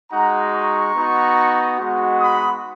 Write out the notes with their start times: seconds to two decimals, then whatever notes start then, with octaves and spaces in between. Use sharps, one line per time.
0.11 G#3 D#4 F#4 F#5 A#5
0.53 A#5 C#6
0.95 B3 D#4 F#4
1.79 G#3 B3 D#4 F#4
2.20 B5 D#6